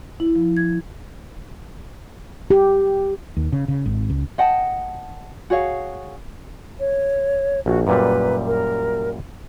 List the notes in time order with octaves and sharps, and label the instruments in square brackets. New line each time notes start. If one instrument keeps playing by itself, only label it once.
[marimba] E4
F3
G#6
[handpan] G4
[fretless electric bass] D#2
C#3
C#3
G#1
C#2
[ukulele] D#5 F#5 G5 A5
F#4 G#4 C#5 F5
[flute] C#5
[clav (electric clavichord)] A#1 [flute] F#4
[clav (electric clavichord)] F#2 A#2 G3 [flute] B4
[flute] A#4